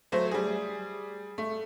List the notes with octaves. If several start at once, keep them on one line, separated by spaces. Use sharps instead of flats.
F#3 A3 C5
G3 G#4
A3